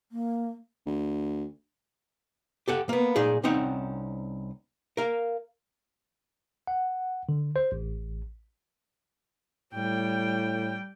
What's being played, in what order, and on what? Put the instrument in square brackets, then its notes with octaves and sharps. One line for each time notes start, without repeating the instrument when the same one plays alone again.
[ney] A#3
[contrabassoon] D2
[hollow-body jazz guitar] G4 A4 F#5
A#3 B3
A#2 D#4 G#4
C2 C4 C#4 D#4 F#5
A#4 F5
[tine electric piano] F#5
D3
C5
A1
[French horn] A2 [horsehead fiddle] G3 G5